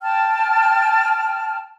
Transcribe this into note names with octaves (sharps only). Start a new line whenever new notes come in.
G5 A5 F6